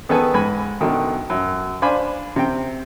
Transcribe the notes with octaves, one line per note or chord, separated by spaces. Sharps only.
D#3 B3 G#4 A4 B4 G#5
G#2 G#5 B5
F#2 B2 D3 D#3
F#2
D4 C5 F5 G#5 B5 D6
C3 G5